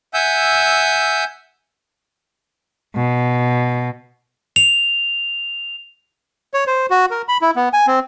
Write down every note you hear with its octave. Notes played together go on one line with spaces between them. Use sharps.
E5 F#5 G#5 E6 G6
B2
F7
C#5
C5
F#4
A#4
B5
E4
B3
G#5
C4